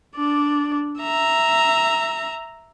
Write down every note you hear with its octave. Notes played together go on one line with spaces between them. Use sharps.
D4 D5
E5 A#5